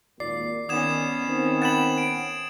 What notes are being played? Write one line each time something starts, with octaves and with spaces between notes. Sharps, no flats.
G#1 D#2 A#2 D5 C7
D#3 B3 C#4 D#6 G#6 E7
D#3 C4
F#5 G5 B5 A6 E7 F#7
D7